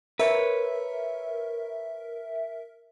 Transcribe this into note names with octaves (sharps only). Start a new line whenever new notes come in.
A#4 B4 C#5 E5